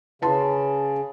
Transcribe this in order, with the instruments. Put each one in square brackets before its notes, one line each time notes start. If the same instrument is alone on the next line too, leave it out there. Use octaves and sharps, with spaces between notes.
[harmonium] C#3 [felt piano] B4 A5 C6